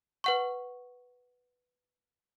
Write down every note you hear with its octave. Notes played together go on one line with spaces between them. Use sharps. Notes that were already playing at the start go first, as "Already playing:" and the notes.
B4 F#5 C#6